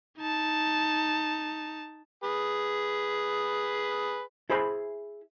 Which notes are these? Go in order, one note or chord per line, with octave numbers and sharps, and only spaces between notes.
D#4 A5
G#4 B4
E4 G#4 C5 E5 B5